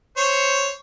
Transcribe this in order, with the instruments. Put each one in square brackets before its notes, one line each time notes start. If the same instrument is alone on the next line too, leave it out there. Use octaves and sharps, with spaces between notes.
[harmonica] C5 C#5 C#6